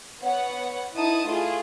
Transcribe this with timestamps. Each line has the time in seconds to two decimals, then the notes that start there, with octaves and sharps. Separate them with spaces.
0.21 B3 C#5 F#5
0.94 D#4 E4 A5 D#6
1.27 A3 F4 G#4